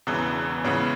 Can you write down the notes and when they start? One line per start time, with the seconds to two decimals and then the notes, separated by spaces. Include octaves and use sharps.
0.07 E1 E2 C#3 E3
0.65 C#2 C#3 E3 B3